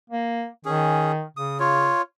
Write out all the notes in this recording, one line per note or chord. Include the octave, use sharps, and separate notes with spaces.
A#3
D#3 C#4 G#4
C#3 D#6
F4 C#5